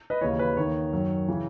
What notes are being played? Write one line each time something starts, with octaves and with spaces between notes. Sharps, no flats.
B4 D#5
D#2 C#3 E3 C#5
B4
D#2 D#3 C#5
F#2 D#3
C#3 E3